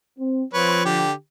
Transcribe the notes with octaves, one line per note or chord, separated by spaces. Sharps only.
C4
F3 C4 B4 C#5
D3 G4